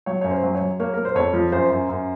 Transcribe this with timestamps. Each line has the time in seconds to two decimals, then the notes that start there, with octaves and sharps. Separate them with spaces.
0.06 F#3 C#5
0.21 F#2 C#5
0.31 C5
0.43 F#3
0.55 C#5
0.61 F#3
0.80 A#3 C#5
0.94 A#3 A#4
1.05 C5
1.16 F2 C#5
1.33 F3
1.52 F#2 C5
1.70 F#2
1.89 F#2